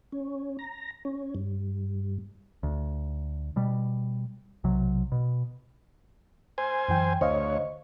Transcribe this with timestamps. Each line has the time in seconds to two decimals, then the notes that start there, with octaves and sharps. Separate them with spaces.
0.12 C#4
0.59 A#5
1.05 C#4
1.35 G2
2.63 D2
3.56 B2 G3
4.64 B1 C3 F#3
5.12 B2
6.58 C5 G#5
6.88 F#2 E3 G5
7.21 D2 C5 C#5 D#5 F5